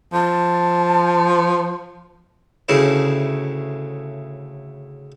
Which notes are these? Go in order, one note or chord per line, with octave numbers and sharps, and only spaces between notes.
F3 A5
D2 A2 C#3 E4